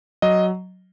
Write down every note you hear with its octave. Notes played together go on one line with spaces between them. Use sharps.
F#3 D#5